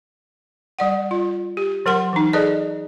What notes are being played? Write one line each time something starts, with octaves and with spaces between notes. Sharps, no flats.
G3 D5 F#5
F4
G4
F#3 A#4 F#5 C6
E3 D#4
G#4 A4 B4 D5 D#5 A5